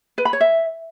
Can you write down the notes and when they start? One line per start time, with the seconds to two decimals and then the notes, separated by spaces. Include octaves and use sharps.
0.18 B4
0.25 B5
0.33 C#5
0.41 E5